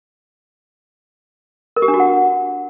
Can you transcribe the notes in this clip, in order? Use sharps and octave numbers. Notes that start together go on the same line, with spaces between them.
A#4
G4
D4
F#4
F#5